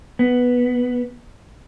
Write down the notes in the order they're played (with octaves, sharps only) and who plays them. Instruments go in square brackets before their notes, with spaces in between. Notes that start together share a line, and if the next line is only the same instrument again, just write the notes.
[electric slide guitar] B3